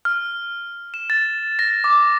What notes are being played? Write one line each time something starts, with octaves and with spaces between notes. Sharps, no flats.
F6
E7
A6
A#6
D6